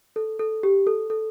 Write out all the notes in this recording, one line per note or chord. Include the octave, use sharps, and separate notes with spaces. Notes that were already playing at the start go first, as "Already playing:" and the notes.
A4
A4
G4
A4
A4